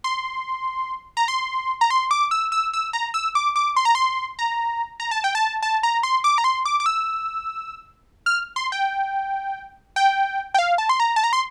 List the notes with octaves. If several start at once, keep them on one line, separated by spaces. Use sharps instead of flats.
C6
A#5
C6
A#5
C6
D6
E6
E6
E6
A#5
E6
D6
D6
C6
A#5
C6
A#5
A#5
A5
G5
A5
A5
A#5
C6
D6
A#5
C6
D6
D6
E6
F6
C6
G5
G5
G5
F5
A5
C6
A#5
A5
A#5
C6